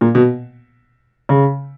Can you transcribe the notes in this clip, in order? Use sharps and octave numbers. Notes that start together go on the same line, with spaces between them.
A#2
B2
C#3